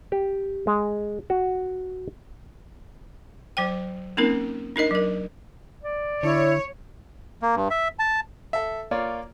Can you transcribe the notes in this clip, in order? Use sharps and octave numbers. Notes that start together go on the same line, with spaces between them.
G4
G#3
F#4
F#3 C5 G5
A#3 C4 C#4 D#4 A#4
D4 D#4 A#4 D#5
F#3 A#4
D5
D3 E4 C#5
A#3
G2
E5
A5
A4 E5
A#3 F4 C#5 D5